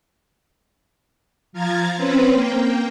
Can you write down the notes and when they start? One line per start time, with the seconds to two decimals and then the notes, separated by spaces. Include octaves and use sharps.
1.53 F3 F5 A#5 G#6 A6
1.97 C4 C#4 B4 C5
2.31 A#3 G5